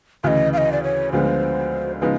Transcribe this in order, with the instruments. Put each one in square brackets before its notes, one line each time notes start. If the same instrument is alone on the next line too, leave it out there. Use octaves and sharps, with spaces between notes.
[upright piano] D2 C#3 E3 [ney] D#5 F5
[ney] F5
D#5
D5
C#5
[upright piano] D2 D3 F3 G#3 B3 [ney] C5
[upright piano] C#3 F3 G#3 B3 D#4 [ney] B4